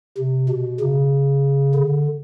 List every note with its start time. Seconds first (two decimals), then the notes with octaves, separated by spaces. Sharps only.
0.18 C3
0.49 B2
0.81 C#3
1.75 D3